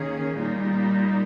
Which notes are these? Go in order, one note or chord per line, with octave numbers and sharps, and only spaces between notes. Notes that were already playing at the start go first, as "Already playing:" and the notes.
Already playing: D#3 A#3 C#4 G#4
A#2 G3 A#3 D#4